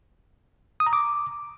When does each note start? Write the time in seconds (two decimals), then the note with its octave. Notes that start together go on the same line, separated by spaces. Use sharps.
0.80 D#6
0.87 A#5
0.93 D6